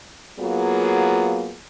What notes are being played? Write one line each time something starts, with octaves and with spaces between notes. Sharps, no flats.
F#3 A#3 B3 F4 G#4